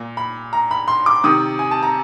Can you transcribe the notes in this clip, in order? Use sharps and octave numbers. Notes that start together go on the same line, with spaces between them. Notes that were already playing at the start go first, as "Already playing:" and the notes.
Already playing: A#2
B5
A#5
B5
C6
D6
C3 D#3 D#6
G#5
A5
A#5